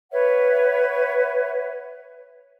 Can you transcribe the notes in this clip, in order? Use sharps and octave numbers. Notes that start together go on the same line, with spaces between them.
B4 C#5 E5 F#5